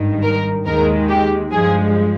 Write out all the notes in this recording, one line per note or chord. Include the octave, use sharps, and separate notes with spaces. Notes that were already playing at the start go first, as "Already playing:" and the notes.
Already playing: G#1 G2 D#3
A#4
D#2 D#3 G#3 A#4
G4
G2 F3 G#3 G#4